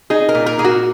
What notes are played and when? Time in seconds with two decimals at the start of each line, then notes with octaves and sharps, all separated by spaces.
0.10 D#4 G#4
0.29 A#4
0.35 A#2
0.46 A#4
0.58 A#3 G#4
0.64 F#4